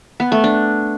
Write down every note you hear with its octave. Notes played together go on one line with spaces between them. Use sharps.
B3
A3
D4